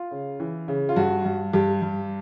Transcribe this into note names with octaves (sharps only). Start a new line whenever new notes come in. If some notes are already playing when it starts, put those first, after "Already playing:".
Already playing: F4
C#3
E3
C#3
F4
G2 F#4
G2
G2 G4
G2